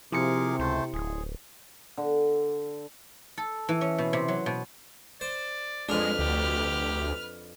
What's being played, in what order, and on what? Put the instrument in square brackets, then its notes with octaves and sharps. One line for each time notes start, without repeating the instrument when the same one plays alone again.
[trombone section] C3 [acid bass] F3 [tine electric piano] E4 C6 C#7 [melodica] G#4 A#4 D6
[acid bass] C#2 [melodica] A3 C5
[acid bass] D1 [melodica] G#4
[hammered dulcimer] D3
[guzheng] A4
E3
C#4
B2
C3
F#3
B2
[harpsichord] C5 [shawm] D5
[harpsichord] F2 D4 [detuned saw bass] G#3 [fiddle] B4 F6
[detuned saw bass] D2 [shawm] G4